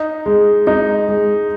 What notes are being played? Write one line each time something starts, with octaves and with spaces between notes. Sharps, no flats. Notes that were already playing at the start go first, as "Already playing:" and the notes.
Already playing: D#4
G#3
D#4
G#3